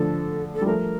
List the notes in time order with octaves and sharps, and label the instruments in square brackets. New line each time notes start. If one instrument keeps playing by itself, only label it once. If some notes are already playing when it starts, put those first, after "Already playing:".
Already playing: [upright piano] D3 F3 [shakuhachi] A4
[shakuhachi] A4
[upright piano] G3
[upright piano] F3 A3 [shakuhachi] A#4